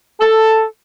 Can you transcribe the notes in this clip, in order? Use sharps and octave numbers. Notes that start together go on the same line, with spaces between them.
A4